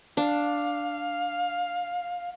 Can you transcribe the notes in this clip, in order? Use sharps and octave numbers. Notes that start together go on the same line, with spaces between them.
D4 F5